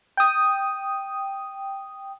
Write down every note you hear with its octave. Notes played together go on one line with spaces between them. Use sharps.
G5 D#6